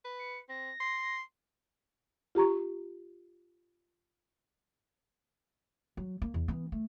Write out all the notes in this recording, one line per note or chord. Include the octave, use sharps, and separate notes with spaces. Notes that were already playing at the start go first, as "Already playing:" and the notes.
B4
C#7
C4 A#6
C6
F4 G4 A#5 C#6
F#3
A#3
E2
E3 B3
A3